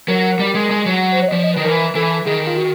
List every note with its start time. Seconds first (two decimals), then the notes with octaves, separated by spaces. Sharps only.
0.08 F#3 A#4
0.39 G3
0.55 G#3
0.71 G#3
0.86 F#3
1.12 C5
1.22 C#5
1.28 D#5
1.32 F3 D5
1.44 D#5
1.54 B4
1.56 D#3
1.64 E3 A#4
1.95 E3 A4
2.26 D#3 G#4
2.47 F4
2.57 F#4